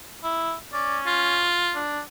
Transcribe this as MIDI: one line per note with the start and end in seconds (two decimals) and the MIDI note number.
0.24 0.54 64
0.73 1.48 61
0.73 0.98 74
1.06 1.78 65
1.75 2.00 62